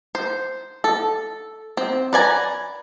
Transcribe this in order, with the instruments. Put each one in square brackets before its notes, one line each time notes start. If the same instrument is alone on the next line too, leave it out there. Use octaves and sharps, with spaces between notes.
[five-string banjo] C5
A4
C4
B4 D5 G#5 A#5